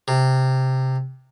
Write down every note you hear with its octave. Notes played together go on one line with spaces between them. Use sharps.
C3